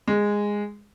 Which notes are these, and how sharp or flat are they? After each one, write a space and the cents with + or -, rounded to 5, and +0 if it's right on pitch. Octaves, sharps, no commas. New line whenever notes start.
G#3 -10